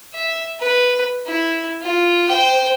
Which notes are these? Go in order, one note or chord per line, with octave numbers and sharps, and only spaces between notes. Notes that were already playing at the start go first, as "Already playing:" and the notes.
E5
B4
E4
F4
C5 G5